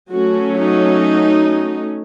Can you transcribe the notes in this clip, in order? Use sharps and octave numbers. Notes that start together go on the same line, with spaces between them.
F#3 A3 C#4 F#4
D#4